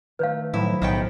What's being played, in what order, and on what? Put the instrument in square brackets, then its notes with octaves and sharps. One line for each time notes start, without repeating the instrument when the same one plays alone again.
[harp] D#3 A3 [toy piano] B4 C#5 F5
[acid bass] A2 [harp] F3 F#3 D#4 [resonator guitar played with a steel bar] E4
[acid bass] B1 [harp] A2 B6 [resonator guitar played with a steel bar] D#3 B3 G5